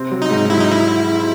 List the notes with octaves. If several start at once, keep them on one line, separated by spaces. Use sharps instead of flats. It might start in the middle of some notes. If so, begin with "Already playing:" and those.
Already playing: C3 C4
F#3
D#4
G#2
F#3 E4
D#4
E4